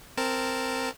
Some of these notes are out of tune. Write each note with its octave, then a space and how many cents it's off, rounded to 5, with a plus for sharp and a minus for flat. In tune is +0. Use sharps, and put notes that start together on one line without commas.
C4 +0 A#4 -10 A5 +0